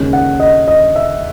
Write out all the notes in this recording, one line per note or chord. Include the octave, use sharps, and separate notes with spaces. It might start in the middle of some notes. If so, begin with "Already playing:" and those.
Already playing: D#2 C#3 G#3 C#4
F#5
D#5
D#5
E5